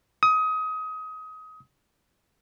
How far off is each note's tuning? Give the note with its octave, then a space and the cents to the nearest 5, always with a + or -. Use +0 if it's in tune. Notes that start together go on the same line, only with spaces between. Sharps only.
D#6 +25